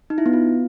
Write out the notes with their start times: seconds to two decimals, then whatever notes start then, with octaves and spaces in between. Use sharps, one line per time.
0.10 D#4
0.18 E4
0.26 B3
0.33 F4